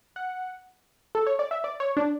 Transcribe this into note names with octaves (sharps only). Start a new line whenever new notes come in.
F#5
A4
C#5
D5
E5
D5
C#5
D4